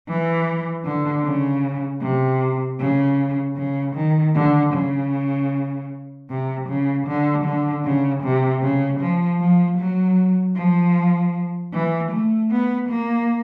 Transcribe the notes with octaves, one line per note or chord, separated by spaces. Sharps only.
E3
D3
C#3
C3
C#3
C#3
D#3
D3
C#3
C3
C#3
D3
D3
C#3
C3
C#3
F3
F3
F#3
F3
E3
A3
B3
A#3